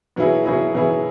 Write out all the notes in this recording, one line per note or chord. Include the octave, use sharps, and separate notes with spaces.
B2 F#3 B3 E4 G#4
B2 F#3 B3 E4 G#4
B2 F#3 B3 E4 G#4